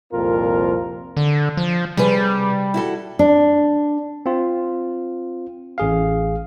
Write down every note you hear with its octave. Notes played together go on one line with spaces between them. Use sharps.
C2 F2 A#2 C4 F4 A#4
D3
F3
C3 G3 G#4 B4
E4 F#4 A4
D4
C4 F4
A1 G#4 F5